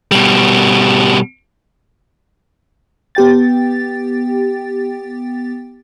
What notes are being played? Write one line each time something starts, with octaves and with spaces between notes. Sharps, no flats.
B2 G3
B3 G4 G5 A6